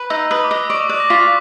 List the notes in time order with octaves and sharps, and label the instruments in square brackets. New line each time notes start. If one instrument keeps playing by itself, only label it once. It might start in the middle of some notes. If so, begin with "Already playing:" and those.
Already playing: [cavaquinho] B4
[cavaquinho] D#4 [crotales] E6
[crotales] E6
[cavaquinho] B4 [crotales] D#6
[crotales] D6
[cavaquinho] D#5
[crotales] D6
[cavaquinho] D5 [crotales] C#6
[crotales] D6
[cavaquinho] D5 [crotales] F#6
[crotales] A#6
[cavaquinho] F4 [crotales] B6